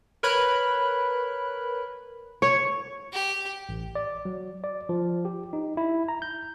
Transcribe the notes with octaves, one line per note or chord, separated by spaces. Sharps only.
A#4 B4 C#5 B5 F#6
C#5
G4
A1
D5
F#3
D5
F3
G4
D#4
E4
A#5
G6